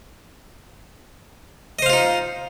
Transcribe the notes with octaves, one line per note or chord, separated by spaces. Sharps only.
D#4 F4 C5 D#5 F5